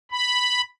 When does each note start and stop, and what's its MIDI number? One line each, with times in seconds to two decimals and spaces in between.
0.11 0.62 83